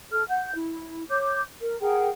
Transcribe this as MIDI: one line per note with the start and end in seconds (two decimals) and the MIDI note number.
0.11 0.23 69
0.11 0.23 89
0.29 0.53 78
0.29 0.53 91
0.55 1.03 64
1.09 1.42 73
1.09 1.42 86
1.09 1.42 91
1.60 1.78 70
1.81 2.09 68
1.81 2.09 70
1.81 2.09 78
1.81 2.09 79